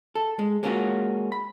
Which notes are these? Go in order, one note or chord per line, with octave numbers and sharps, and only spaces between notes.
A4
G#3
G#3 A#3 C#4 D4 F4 F#4
B5